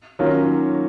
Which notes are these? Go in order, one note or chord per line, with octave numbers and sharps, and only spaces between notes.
D#3 F#3 A#3 C#4 F4